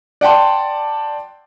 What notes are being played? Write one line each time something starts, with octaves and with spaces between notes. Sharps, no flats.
D5 F#5 G5 A5 C6